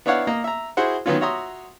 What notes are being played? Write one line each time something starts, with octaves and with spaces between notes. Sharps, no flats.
B3 D4 E4 C#5 F5 F#5
A#3 D#5 A#5
E5 A#5
E4 F#4 G#4 C5 F#5
D#3 F#3 B3 C#4 F4
F#4 C#5 E5 A#5 C6 D#6